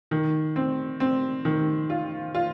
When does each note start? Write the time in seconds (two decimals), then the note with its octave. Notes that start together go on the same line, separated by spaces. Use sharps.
0.11 D#3
0.56 C4
1.00 C4
1.45 D#3
1.90 F4
2.35 F4